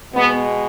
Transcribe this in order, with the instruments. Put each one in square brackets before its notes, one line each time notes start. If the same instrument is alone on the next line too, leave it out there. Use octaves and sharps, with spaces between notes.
[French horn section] B2 G#3 B3